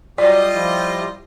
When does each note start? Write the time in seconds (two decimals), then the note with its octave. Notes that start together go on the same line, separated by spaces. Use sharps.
0.18 F#3 G3 F4 G4 D5 D#5
0.54 F3 E4 G4